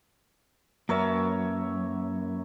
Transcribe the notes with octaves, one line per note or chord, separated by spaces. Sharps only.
F#2 A#3 A#4 B4 C#5 E5 A5